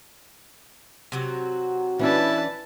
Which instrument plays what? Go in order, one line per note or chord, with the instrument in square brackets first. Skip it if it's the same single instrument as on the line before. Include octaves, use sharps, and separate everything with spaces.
[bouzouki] C3 F#3 F#4
[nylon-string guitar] E3 C#4 D4 [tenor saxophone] E4 [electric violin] B4 A5